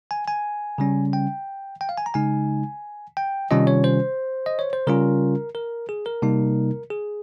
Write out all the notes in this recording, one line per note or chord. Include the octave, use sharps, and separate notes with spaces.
G#5
G#5
C#3 G3 C#4
G5
G5
F5
G#5
A#5
C#3 G#3 D#4 G#5
G5
C3 D#3 G3 C#4 F4 D#5
C#5
C5
D#5
C#5
C5
C#3 G3 C#4 F4 A#4
A#4
G#4
A#4
C3 G3 A#3 D#4
G#4